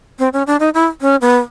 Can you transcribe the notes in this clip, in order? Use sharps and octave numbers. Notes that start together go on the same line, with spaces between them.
C4
C#4
D4
D#4
E4
C#4
B3